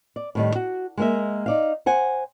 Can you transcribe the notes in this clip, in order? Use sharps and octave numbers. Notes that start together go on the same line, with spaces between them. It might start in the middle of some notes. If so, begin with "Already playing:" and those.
D5
A2 D#3 G3
F#4
G#3 A#3 E5
D#4 D5 F5
C5 F#5 G#5